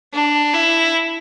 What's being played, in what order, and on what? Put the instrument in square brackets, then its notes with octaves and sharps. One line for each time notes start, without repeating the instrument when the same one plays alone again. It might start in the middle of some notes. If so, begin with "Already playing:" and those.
[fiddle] D4
E4